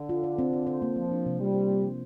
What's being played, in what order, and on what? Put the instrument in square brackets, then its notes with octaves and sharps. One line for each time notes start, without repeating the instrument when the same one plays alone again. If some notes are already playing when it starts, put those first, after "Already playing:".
Already playing: [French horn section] D3
[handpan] F4
D5
C4
F4
C5
A#3
[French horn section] F3 [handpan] A#3
[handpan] D4
C3
[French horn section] G3 [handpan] F4
[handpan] C5
A#3
F3